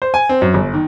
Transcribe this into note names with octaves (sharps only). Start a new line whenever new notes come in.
C5
G#5
C4
F#2
G1
D#3